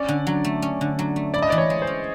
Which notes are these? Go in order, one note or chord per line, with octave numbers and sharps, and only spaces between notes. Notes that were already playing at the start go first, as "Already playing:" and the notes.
Already playing: C#4 D5
D3
F#3
A3
C#4
D3
F#3
A3
E4 D5
D#5
E3 D5
C#5
G#3
C5
C#4